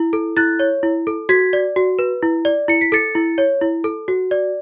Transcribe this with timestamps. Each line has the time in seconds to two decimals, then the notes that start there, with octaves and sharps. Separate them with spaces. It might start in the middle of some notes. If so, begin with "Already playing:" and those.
Already playing: E4
0.13 A4
0.37 E4 F#6 A6
0.59 C#5
0.83 E4
1.07 A4
1.29 F#4 G#6 B6
1.53 D5
1.76 F#4
1.99 B4
2.23 E4
2.45 D5
2.68 E4 C#7
2.81 B6
2.92 A4 A6 C#7
3.15 E4
3.38 C#5
3.62 E4
3.84 A4
4.08 F#4
4.31 D5